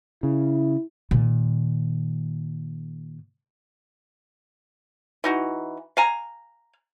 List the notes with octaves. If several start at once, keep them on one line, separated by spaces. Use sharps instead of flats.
C#3 E4
A#2 D#3
E3 D#4 F#4
F5 G#5 A#5